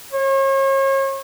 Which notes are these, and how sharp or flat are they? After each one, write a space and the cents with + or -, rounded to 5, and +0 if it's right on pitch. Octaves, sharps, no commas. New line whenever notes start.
C#5 -40